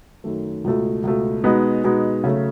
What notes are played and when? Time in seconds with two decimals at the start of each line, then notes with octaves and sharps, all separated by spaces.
0.24 F#2 D#3 A3
0.64 C#2 B2 A3
1.03 C#2 B2 A3
1.44 B2 G#3 B3 D#4
1.84 B2 G#3 B3 D#4
2.24 C#3 F#3 A3